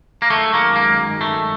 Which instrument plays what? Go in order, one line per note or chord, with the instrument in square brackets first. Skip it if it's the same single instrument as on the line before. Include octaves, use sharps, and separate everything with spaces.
[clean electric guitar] A#3
[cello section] F#2 D#3 G#3 [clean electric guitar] A3
[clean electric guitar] A#3
A#3
A3